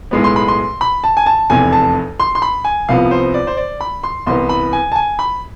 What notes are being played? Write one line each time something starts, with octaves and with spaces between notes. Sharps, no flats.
B1 A2 G#3 B3
C6
B5
C6
B5
A5
G#5
A5
F1 E2 C3 G#5
A5
C6
C6
B5
G#5
C2 C3 F3 B3 F5
C5
D5
C5
D5
B5
C6
C2 C3 E3 B3 C6
B5
G#5
A5
G#5
B5